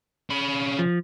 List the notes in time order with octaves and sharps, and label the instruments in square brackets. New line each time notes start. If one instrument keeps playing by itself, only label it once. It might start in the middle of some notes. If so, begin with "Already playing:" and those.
[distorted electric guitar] C#3 B5
[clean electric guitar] F3